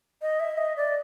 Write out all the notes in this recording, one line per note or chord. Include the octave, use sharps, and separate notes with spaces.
D#5
E5
D#5
D5